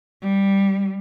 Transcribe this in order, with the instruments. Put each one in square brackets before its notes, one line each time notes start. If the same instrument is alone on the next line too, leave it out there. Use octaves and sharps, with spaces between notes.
[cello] G3